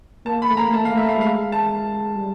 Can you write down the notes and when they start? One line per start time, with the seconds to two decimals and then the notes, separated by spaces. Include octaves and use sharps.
0.25 A#3 A5
0.42 B5
0.49 A3
0.57 A#5
0.60 A#3
0.73 A3 A5
0.85 A#3 F5
0.95 A3 E5
1.09 F5
1.17 G3
1.21 G#3 F5
1.52 A5
2.16 G3